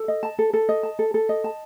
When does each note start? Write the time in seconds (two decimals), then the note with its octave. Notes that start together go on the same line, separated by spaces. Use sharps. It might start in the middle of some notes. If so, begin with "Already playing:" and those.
Already playing: A4
0.08 D#5
0.23 A5
0.39 A4
0.53 A4
0.69 D#5
0.83 A5
0.99 A4
1.14 A4
1.29 D#5
1.44 A5